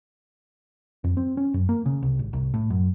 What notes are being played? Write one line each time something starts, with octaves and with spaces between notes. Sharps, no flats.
F2
C4
C#4
F#2
A#3
C#3
C2
G#1
C2
A2
F#2